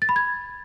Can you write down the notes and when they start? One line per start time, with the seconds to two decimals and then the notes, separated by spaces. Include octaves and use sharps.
0.02 A6
0.09 B5
0.16 G#6